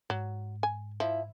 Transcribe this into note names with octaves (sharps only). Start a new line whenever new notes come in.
G#2 F#3
G#5
F3 E4